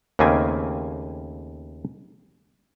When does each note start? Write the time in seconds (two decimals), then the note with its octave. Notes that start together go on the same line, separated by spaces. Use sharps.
0.19 D#2 C#3 A3 A#3 C4 G#5